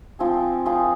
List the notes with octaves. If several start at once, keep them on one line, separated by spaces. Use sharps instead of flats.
F3 C4 F4 G#4
F3 C4 F4 G#4